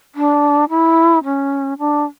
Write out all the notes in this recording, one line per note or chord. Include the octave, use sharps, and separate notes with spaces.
D4
E4
C#4
D4